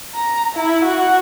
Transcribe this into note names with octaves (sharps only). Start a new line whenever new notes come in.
A#5
E4
F#4